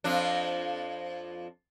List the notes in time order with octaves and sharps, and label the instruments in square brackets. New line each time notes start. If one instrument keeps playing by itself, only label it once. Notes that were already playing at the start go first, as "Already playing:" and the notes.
[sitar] F2 F3 D4